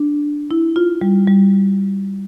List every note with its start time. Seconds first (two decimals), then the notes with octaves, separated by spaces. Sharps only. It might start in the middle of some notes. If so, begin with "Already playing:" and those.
Already playing: D4
0.51 E4
0.76 F4
1.01 G3
1.28 G3